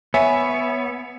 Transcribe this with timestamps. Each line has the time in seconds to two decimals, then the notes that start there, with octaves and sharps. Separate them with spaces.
0.14 B3 C#5 E5 G#5